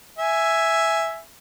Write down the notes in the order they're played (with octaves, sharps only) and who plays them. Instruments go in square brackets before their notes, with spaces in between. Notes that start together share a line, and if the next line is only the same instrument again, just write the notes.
[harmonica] E5 G#5